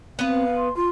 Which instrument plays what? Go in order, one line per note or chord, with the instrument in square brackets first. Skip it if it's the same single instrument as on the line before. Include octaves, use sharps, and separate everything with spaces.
[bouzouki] B3 B4 [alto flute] C4 [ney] F5
[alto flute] C6
[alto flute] F4 [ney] C6